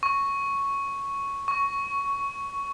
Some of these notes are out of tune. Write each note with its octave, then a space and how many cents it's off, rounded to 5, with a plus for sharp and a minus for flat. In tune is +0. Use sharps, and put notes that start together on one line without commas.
C#6 +0
C#6 +10